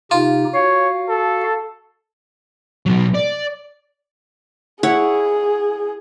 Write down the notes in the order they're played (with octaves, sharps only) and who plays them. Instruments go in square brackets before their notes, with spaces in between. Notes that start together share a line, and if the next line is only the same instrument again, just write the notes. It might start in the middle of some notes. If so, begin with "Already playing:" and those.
[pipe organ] C3 D#4 G4 [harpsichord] F4
[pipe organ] F#4 F5 [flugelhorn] C#5
[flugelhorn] A4
[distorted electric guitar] B2 F#3
D5
[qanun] E4 C#5 F#5 [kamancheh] G#4